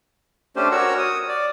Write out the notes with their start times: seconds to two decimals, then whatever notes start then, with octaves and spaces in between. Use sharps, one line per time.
0.56 A3 C#4 D4 G4 C5
0.72 F#4 A#4 C#5 F#5 E6
0.98 D#6
1.29 D5